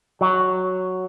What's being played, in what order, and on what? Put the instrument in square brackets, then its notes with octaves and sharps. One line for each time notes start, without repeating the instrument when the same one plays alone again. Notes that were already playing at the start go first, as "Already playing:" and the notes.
[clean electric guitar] F#3